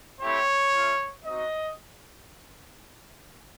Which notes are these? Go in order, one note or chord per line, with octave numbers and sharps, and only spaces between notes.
A3 C4 E4 G4 C#5
A3 C#4 F4
C4 D#4 F#4 D#5